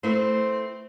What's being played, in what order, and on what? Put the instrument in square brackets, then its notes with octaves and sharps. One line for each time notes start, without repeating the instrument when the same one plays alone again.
[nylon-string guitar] A3 E4 B4 [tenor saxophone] C4